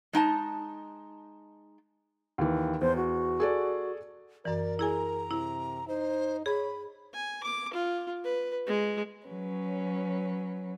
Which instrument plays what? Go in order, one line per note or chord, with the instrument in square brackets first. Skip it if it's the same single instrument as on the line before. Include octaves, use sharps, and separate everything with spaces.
[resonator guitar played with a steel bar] G#3 D#4 G5 A5
[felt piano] D#2 E3
[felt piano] E2 [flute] C5
[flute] F#4
[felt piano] G#4 A4 D5
[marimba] F#2 E3 [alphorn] A#4 [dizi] D5
[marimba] E4 G#4 G#5 [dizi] A#5
[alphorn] C3 [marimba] E4
[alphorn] D#4 [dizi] C5
[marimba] G#4 [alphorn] C#5 [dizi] B5
[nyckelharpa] G#5
D6
F4
B4
G#3
[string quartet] F#3 C#4 B4